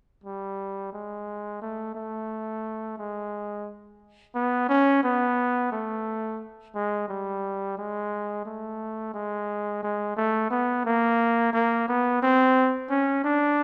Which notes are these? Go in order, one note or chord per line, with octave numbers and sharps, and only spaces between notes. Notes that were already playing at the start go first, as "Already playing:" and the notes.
G3
G#3
A3
A3
G#3
B3
C#4
B3
A3
G#3
G3
G#3
A3
G#3
G#3
A3
B3
A#3
A#3
B3
C4
C#4
D4